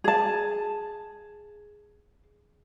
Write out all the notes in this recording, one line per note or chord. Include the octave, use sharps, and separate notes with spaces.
G#4 A5